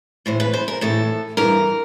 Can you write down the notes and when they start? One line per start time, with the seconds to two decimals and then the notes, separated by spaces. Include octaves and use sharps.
0.26 A2 E3 C5
0.40 B4
0.53 C5
0.68 A#4
0.81 A2 E3 A4
1.37 G2 E3 A#4